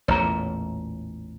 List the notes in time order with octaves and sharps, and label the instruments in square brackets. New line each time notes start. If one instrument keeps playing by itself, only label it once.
[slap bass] A1 E2 A#2 [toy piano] C#5 A#5